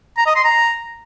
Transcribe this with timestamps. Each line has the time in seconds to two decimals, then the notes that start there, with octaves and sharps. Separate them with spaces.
0.17 A#5
0.26 D#5
0.35 C6
0.44 A#5